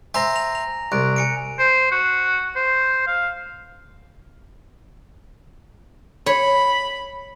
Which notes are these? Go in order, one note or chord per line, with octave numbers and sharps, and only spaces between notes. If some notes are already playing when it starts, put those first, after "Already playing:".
C5 E5 G#5 A#5 A#6
F7
F7
C2 F#6 D7
G#5 C#7 D7
C5
F#4
C5
F5
C#5 B5